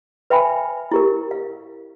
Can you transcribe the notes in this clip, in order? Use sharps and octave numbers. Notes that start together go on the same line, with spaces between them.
B4 E5 G5 G#5 B5
E4 G4 A#4
F5